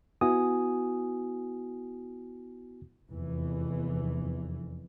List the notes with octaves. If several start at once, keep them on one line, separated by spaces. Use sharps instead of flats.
B3 E4 F#4 G#5 D#6
F1 E2 E3